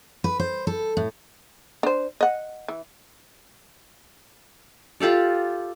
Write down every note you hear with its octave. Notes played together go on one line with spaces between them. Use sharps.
B4
C5
A4
A2
D4 C5
D#5 F#5
E3
F4 G4 A4 D5